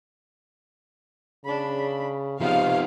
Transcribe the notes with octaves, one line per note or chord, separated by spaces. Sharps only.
C#3 D4 B5
C3 F3 B3 D#4 F5